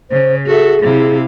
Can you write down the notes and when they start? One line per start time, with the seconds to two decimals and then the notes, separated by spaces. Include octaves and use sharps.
0.11 C#3 C5
0.46 F#4 G#4 A4 E5
0.82 C3 E4 F5